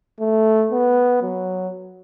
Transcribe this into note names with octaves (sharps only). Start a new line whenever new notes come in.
A3
B3
F#3